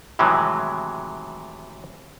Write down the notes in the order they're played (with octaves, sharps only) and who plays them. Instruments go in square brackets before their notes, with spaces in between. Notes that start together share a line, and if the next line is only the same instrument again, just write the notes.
[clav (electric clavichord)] A2 C3 D#3 E3 F#3 G#3